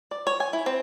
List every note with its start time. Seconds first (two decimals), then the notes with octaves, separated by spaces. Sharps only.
0.11 D5
0.27 C#5
0.40 G#5
0.53 E4
0.66 C4